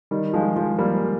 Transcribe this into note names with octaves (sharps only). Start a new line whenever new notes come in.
D#3 G3
F3 G#3
F3 G#3
G3 A#3